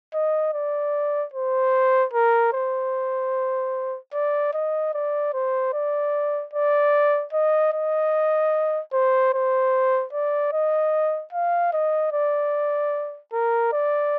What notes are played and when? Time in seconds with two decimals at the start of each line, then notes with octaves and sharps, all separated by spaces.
0.14 D#5
0.54 D5
1.34 C5
2.14 A#4
2.53 C5
4.13 D5
4.54 D#5
4.94 D5
5.34 C5
5.74 D5
6.54 D5
7.33 D#5
7.73 D#5
8.93 C5
9.34 C5
10.13 D5
10.53 D#5
11.33 F5
11.73 D#5
12.13 D5
13.33 A#4
13.73 D5